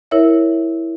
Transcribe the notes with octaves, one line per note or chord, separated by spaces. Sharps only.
E4 A#4 C#5 E5